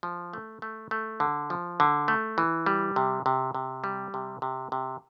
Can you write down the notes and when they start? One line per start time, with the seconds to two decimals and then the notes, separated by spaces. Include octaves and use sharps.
0.03 F3
0.33 A3
0.62 A3
0.91 A3
1.20 D3
1.50 F3
1.80 D3
2.08 A3
2.38 E3
2.66 G3
2.96 C3
3.26 C3
3.55 C3
3.84 G3
4.14 C3
4.42 C3
4.72 C3